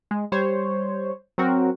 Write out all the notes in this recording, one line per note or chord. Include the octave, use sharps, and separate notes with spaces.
G#3
G3 C5 C#5
F#3 C4 F#4 A#4